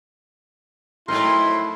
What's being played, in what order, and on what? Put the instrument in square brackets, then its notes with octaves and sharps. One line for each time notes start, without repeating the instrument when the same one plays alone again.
[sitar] F2 F#3 [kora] A3 D#4 A#4 [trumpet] E4 [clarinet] C6